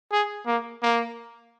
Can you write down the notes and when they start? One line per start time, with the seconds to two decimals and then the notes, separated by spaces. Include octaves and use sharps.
0.12 G#4
0.47 A#3
0.82 A#3